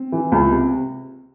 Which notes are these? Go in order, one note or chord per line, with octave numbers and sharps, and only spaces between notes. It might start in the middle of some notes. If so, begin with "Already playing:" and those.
Already playing: C4
E3
C#2
C3